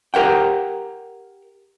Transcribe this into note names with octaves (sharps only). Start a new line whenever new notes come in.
G4 A#4 F#5 G5